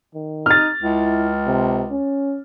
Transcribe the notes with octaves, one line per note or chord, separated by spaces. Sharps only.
D#3
D#4 F6 A6
C#2 E4
C3
C#4